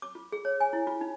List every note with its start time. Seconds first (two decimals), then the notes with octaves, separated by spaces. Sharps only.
0.02 D6
0.15 F4
0.32 G#4
0.45 C#5
0.60 G#5
0.73 E4
0.87 F4
1.01 D#4